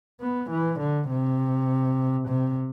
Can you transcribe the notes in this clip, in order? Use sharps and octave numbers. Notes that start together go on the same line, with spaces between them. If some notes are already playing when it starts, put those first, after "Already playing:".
B3
E3
D3
C3
C3